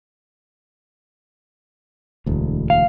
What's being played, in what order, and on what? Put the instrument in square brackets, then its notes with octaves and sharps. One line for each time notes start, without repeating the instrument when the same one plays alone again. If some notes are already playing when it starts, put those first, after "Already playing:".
[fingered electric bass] E1 D2
[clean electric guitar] F5